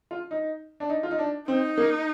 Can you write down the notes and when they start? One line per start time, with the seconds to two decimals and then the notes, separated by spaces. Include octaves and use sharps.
0.11 F4
0.31 D#4
0.80 D4
0.90 D#4
1.03 F4
1.11 D#4
1.19 D4
1.48 C4 D#4
1.78 A#3